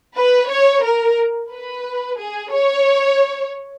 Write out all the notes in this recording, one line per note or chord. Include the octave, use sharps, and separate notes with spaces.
B4
C#5
A#4
B4
G#4
C#5